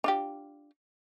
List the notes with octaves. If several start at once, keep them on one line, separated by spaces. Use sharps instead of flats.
D4 F4 G4